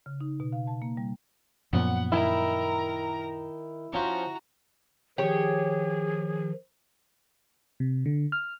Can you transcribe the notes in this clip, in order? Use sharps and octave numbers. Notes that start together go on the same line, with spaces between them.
C#3
D#4
B2
F5
A5
A#3
G3
F#2 A#2 F3 B3 F#5
D#3 E4 A#4 A#5
F3 C#4 F#4 A#5 C#6
D#3 F3 G4 G#4 C#5
C3
D3
F6